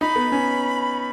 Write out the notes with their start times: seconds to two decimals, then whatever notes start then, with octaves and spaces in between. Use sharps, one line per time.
0.01 D#4 B5
0.16 B3
0.32 C#4